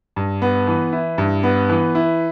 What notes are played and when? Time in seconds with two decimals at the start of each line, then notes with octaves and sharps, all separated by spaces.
0.16 G2
0.42 B3
0.67 E3
0.93 E4
1.18 G2
1.43 B3
1.69 E3
1.95 E4